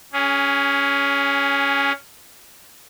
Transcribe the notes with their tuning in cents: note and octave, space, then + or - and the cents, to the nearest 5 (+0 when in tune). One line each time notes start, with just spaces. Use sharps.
C#4 +15 G#4 -10